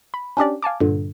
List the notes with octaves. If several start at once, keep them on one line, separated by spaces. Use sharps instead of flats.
B5
C#4 D4 G4 D5
F5 G#5 A5 D6
G2 A#2 D3